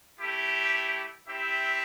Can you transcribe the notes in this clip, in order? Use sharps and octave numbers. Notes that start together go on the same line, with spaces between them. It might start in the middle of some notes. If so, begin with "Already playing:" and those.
A3 E4 G4
C4 E4 G4 E5